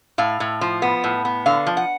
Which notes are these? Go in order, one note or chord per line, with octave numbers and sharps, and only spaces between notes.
A2 F5
A2
F3
B3
A2
B3
D3 F5
F3
F#5